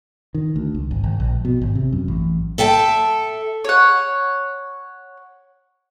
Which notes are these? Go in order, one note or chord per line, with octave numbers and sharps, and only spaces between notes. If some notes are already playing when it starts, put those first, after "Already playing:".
D#3
D2
C#2
G#1
G#1
A#1
B2
G#1
C3
F#2
A1
A4 E5 G5 A5
C#5 F#5